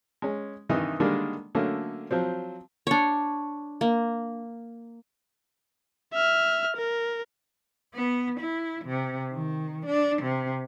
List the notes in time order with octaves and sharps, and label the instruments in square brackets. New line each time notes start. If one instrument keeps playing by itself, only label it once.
[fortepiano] G#3 C#4
G2 C3 D#3 E3 D#4
D3 D#3 G3 G#3 A#3 D4
D3 F#3 A3 A#3 C#4
F3 F#3 C4
[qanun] D4 C#5
A#3
[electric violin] E5 F6
A#4
[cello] B3
E4
C3
D#3
D4
C3